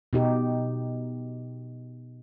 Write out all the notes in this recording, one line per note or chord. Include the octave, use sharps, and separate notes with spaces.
B2 D#4 G4